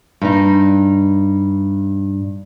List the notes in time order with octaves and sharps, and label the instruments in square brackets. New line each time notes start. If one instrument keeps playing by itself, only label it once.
[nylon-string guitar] G2 D#4